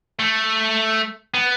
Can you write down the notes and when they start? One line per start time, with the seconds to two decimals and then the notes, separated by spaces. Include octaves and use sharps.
0.19 A3
1.34 B3